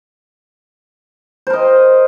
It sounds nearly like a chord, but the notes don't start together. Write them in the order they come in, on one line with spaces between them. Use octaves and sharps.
C5 A#4 D#5